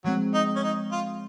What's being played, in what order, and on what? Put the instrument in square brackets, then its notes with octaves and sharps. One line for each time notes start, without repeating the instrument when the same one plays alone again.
[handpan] F3 G#3 C4 [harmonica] F#3
[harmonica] D#4
C#4
D#4
F4